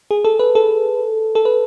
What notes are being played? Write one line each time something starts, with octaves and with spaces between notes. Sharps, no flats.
G#4
A4
B4
A4
A4
B4